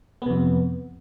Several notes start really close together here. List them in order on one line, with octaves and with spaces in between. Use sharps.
B3 C3 F2